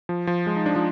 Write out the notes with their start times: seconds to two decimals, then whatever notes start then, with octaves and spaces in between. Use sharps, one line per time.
0.09 F3
0.27 F3
0.47 G#3
0.56 D#4
0.66 D4
0.76 F3